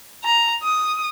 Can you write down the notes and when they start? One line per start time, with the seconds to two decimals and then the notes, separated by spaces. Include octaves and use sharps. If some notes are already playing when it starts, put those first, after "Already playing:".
0.24 A#5
0.63 D#6